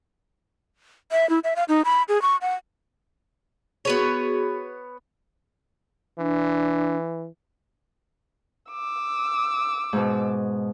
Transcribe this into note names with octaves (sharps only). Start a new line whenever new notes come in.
E5
E4
E5
F5
D#4
B5
G#4
C#6
F#5
B3 F#4 G#4 B4 C#5
E3 D4
D6 E6
G#2 B2